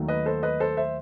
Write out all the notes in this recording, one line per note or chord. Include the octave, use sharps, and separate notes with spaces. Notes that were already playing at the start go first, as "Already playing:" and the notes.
Already playing: D#2 D#3 F#3 A3
B4 D#5
A4 C5
B4 D#5
A4 C5
C5 E5